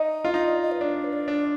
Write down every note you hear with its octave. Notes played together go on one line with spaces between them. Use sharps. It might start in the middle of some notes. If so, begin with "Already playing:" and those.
Already playing: D#4 D#5
F4
D#4 D#5
D5
D#5
B4
D4 D5
B4
D5
D4